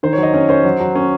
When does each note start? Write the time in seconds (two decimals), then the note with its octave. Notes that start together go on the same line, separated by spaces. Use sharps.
0.03 D#3 C5
0.13 C#5
0.18 F#3
0.23 D#5
0.34 C#4 C#5
0.49 C#4 C5
0.65 F#3
0.80 F#3
0.95 C#4